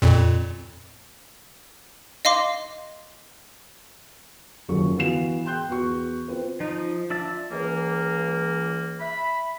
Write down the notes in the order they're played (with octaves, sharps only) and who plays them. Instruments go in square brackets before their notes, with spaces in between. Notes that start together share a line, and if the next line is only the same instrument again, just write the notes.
[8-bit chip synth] F2 A#2
[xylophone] D#5 F5 C6 D6
[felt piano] F#1 D#2 F3 F#3 A4 C#6
E3 B3 F#4 F5 C7 E7
G5 C6 F#6 G6
E2 B3 F#4 C#6
C4 F4 B4 C5
[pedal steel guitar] F3 [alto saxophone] D#4
[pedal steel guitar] D4 E5 A5 [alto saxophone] F4
[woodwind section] C#2 E3 A#3
E5 B5